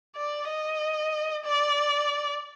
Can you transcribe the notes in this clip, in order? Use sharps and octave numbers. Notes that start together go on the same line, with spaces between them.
D5
D#5
D5